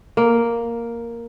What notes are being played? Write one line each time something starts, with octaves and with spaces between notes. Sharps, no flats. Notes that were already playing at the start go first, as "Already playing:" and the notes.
A#3